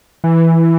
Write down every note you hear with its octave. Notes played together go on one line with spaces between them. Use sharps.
E3